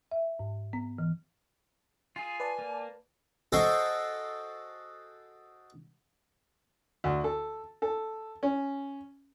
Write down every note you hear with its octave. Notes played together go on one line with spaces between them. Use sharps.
E5
G#2
B3
E3
F4 G#4 G#5
B4 D5 A5
A#3
F#4 G#4 A4 C5 D#5 G5
D2
A4
A4
C#4